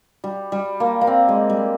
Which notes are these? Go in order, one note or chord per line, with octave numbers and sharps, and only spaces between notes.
G3
G3
A#3
A#3
C4
G#3
G3